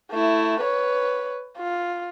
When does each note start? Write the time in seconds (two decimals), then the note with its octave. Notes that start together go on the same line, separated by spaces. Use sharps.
0.12 A3 E4
0.60 B4 C#5
1.58 F4